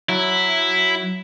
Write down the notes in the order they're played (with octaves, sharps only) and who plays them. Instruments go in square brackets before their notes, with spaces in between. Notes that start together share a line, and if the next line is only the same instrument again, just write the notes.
[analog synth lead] F#3 [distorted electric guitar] E4